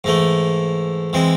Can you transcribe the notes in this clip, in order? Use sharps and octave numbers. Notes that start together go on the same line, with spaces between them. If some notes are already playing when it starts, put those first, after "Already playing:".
G#2 E3 A3
E3 G#3 C4